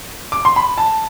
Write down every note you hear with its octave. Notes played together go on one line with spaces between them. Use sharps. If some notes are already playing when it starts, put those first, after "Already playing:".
D6
C6
B5
A5